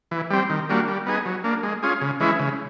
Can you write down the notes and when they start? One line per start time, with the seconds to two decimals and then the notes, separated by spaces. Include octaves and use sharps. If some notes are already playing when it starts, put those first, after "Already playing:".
0.11 E3
0.30 G3 C4
0.50 D#3
0.69 G3 A#3 D4 F#4
0.88 G3
1.06 B3 D#4 G#4
1.26 F#3
1.44 A#3 D4
1.63 G#3
1.83 C#4 F4 G#4
2.01 C#3
2.20 E3 G#3 C#4 E4
2.39 C#3